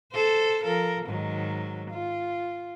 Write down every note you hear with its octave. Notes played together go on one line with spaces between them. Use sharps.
A4 C5
F3 A4 A#4
G#2 D#3 F#3
F4